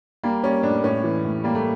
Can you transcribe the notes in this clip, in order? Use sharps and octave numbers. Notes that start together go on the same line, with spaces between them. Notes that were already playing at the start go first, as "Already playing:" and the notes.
G3 A#3
G3 C#4
A2 D4
A2 C#4
E3
A2
G3 A#3
A3